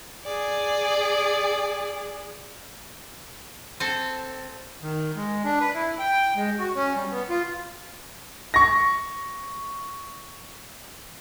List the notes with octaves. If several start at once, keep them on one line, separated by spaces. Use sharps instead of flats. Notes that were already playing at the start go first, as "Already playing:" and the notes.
G#4 D5
C4 A4
D#3
G#3
D4
B4
E4
G5
G#3
F#4
C#4
G3
B3
F4
C#6 A#6